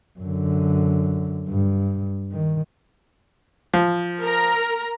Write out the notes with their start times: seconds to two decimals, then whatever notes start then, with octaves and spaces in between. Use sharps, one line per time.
0.19 F#2 D3
1.48 G2
2.31 D#3
3.74 F3
4.21 A#4 A#5